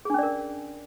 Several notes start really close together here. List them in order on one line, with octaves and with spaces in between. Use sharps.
G#4 D4 C#4 D5 A#4